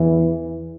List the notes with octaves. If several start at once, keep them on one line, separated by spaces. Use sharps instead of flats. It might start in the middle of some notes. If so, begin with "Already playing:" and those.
Already playing: E2 E3